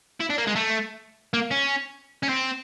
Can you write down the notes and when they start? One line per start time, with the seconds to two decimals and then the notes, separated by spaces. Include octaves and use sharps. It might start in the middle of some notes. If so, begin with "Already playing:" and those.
0.20 E4
0.30 D4
0.38 A#3
0.47 G#3
0.56 A3
1.34 A#3
1.51 C#4
2.23 C#4
2.29 C4